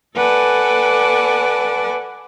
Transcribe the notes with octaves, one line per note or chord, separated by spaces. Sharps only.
A4 B4 D5 F#5 G#5 A5